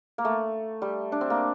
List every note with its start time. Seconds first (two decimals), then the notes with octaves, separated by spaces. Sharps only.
0.18 A#3
0.25 A3
0.82 G3
1.12 D4
1.21 C4
1.30 A#3